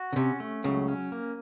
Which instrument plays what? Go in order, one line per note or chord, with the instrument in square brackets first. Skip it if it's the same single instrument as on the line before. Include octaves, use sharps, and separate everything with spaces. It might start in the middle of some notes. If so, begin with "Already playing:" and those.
Already playing: [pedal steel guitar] F#4
[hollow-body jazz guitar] C#3
[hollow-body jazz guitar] C3 [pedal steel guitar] C#4
[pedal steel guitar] A3
[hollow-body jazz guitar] C#2 C#3 [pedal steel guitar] F#3
[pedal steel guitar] C#4
A#3